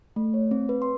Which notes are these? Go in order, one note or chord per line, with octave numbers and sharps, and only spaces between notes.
A3
C#5
C4
B4
C6